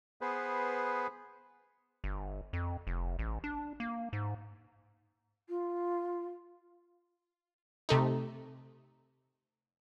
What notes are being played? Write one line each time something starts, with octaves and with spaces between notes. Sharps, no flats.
B3 G#4 B4 C5
G1
F2
F1
A1
D4
A#3
G#2
F4
C3 A3 D#4